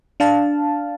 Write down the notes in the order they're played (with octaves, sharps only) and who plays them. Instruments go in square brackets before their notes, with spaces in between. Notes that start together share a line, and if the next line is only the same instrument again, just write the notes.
[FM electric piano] D4 F5 A5